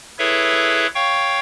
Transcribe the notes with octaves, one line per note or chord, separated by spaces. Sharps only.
E4 G#4 A4 B4 C#5 E5
C#5 F5 G5 C#6